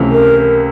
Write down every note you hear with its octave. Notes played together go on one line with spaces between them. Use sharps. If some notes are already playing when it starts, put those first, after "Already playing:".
Already playing: C#2 C3 E3 A3 C#4
A#4